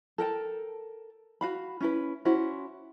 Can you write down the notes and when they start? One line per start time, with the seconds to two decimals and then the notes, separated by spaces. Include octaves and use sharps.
0.18 A4 A#4 G5 A5
1.41 F#4 F5 B5
1.81 C#4 E4 B4
2.25 C#4 E4 F#4 C5